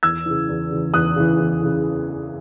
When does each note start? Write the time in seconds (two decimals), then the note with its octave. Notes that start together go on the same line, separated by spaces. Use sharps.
0.03 E2 E6 G#6
0.26 C#3 E3
0.49 E2
0.71 C#3 E3
0.94 E2 D#6 F#6
1.16 C#3 E3
1.39 E2
1.62 C#3 E3